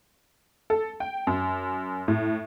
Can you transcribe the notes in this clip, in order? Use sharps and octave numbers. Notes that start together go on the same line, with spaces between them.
A4
G5
F#2
A2